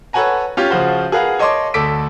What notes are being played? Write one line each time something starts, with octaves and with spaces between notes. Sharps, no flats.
A4 B4 C#5 F#5 G#5 A#5
C#4 F4 G4
C#3 F3 F4 F#4 C5
G#4 A#4 B4 F5 F#5
C#5 D#5 A5 C6 D6
D2 A4 D6 B6 D7